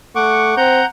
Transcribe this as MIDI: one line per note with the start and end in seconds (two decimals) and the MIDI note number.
0.15 0.57 57
0.15 0.55 78
0.15 0.55 85
0.15 0.55 86
0.57 0.81 60
0.57 0.85 78
0.57 0.85 82
0.57 0.85 91